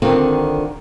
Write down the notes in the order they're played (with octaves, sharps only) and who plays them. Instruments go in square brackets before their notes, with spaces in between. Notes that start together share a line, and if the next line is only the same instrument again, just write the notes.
[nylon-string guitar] D3 D#3 C4 F4